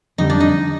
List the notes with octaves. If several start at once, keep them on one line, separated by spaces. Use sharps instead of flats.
F2 D3 G3 D#4
D4
D#4